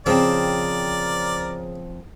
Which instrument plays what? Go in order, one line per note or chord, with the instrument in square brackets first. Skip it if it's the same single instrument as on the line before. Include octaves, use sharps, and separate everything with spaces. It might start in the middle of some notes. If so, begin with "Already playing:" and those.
[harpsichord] C#3 [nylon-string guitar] F3 C4 G5 [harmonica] A#4 D5